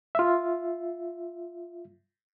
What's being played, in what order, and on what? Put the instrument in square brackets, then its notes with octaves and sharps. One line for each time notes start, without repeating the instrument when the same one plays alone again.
[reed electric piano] F4 E5